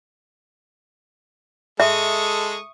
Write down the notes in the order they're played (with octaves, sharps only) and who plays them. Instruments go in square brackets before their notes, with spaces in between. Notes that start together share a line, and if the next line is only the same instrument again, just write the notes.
[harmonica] G#3 A4 [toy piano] E5 [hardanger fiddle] C#6 D#6